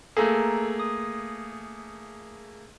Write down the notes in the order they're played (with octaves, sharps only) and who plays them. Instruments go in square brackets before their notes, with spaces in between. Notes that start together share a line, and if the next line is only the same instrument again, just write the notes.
[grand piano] A3 A#3 G#4 [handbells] A4 A#5
[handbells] D#6